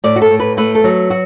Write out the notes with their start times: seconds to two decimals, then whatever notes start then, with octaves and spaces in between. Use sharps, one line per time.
0.04 A2 D5
0.16 F#4
0.22 A4
0.31 A2
0.40 B4
0.57 A3 B4
0.75 A4
0.84 F#3
1.10 F#4